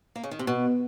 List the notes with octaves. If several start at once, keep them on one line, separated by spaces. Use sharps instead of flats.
A#3
C#3
D#3
C3
B2